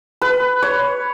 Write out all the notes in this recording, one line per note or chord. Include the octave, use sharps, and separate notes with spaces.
B4
C#5